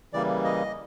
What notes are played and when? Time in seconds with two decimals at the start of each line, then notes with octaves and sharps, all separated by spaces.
0.13 C#3 E3 G3 A#3 D5
0.44 D#5